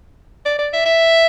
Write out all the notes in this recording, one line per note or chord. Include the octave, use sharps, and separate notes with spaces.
D5
D5
E5
E5